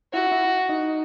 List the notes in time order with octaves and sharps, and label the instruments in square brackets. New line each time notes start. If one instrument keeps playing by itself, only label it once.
[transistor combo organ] E4 [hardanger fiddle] F#4
[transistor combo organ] E4
D#4